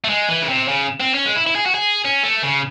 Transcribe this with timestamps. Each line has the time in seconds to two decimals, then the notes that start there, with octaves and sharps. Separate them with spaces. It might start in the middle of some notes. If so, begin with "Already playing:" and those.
0.04 A3
0.09 G#3
0.29 E3
0.42 C#3
0.49 C3
0.68 C#3
1.00 C4
1.14 C#4
1.26 G#3
1.36 E4
1.47 E4
1.55 G#4
1.66 F#4
1.74 G#4
2.05 C#4
2.23 A3
2.43 C#3